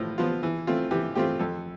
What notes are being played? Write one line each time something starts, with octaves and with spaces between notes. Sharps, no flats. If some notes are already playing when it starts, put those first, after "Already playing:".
Already playing: A2 F3 B3 F4
F3 B3 F4
E3
A3 C4 F4
E3 G4
A3 C4 F4 G4
F2 A4